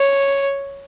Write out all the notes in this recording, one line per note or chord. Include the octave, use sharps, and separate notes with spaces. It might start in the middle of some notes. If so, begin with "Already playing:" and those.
Already playing: C#5